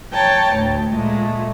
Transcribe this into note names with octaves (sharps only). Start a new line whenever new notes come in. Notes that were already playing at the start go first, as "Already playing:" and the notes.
C#5 G5 A5 A#5
D2 A2
A#2 G#3 A3